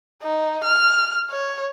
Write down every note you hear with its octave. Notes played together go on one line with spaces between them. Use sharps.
D#4
F6
C#5